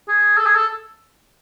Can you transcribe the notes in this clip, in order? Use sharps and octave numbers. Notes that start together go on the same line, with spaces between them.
G#4
A4
G#4
A4